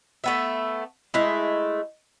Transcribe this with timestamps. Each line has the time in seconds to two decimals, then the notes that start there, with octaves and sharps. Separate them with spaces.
0.24 A3 B3 E5
1.14 G#3 A3 E4